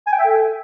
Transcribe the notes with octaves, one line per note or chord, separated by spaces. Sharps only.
G#5
G5
E5
A4